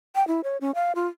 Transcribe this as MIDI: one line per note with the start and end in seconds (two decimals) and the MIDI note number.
0.15 0.26 79
0.28 0.41 64
0.44 0.57 73
0.61 0.71 61
0.75 0.92 77
0.95 1.07 65